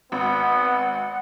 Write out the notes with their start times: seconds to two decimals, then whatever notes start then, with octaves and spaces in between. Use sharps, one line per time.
0.12 G#1 B3 F#5